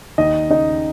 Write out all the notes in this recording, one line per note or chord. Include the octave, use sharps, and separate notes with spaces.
D#2 D#4 D#5
C#3 D#4 D#5